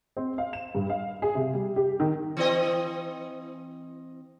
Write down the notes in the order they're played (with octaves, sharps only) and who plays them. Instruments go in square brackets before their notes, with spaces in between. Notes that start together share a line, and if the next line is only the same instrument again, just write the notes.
[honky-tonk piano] C4
F5
E7
G2
F5
G#4
C3
G3
G4
D#3
[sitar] E3 C4 D#5